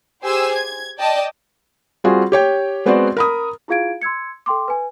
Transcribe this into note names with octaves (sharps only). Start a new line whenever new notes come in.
G4 G#4 C5 G#5 E6
G#6
D5 D#5 G5 A5
G3 C4 F4 F#4 G#4
G4 C#5 G5
G#3 B3 C4 F#4 C5 D5
A#4 B5 D#6
E4 F4 G#4 F5 G#6 D7
C6 E6 G#6 C#7
A4 G5 C6 D6
B4 G#5